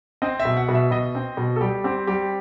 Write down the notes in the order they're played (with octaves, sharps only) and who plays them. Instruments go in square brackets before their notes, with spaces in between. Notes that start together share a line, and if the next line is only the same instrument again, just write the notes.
[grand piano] C4 D#5
E5
B2
F#5
B2
E5
B2 D#5
C4
B2
A4
G3 G4
C4 G4
G3 G4